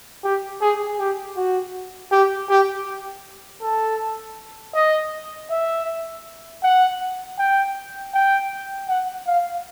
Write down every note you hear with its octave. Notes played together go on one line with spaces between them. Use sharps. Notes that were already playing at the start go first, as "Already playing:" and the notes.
G4
G#4
G4
F#4
G4
G4
A4
D#5
E5
F#5
G5
G5
F#5
F5